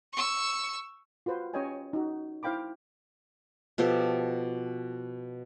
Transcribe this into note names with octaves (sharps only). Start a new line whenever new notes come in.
C#6 E6
F4 F#4 B4 C5
C#4 G4 C#5 D#5 G5 G#5
D#4 F#4
E4 C5 F5 G5 B5 D6
B2 F3 G4 A4